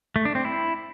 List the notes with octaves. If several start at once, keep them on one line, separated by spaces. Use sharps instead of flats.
A3
D4
C4
E4